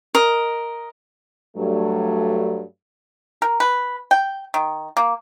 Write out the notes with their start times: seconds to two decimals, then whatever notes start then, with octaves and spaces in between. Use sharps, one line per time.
0.15 A#4 D#5
1.57 G2 F#3 A3
3.42 A#4
3.60 B4
4.11 G5
4.54 D#3
4.97 A#3